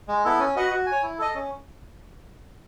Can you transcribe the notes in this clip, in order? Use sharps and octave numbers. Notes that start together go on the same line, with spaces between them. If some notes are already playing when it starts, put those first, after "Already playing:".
G#3
B3 E4 A4
C#4
F#4 B4 D#5 F#5
F#4
G#5
C#5
E4
A4 D#5
C#4